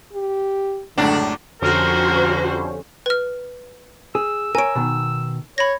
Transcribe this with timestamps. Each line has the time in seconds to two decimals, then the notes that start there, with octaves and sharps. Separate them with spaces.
0.13 G4
0.98 C#2 F#2 A2 D3 D4
1.62 F2 D3 C#4 F#4 G4 A#4 C5
3.06 B4 F6
4.15 G#4 E6
4.55 A#4 C#5 G#5 D7
4.75 B2 D#3
5.58 C#5 B5 A#6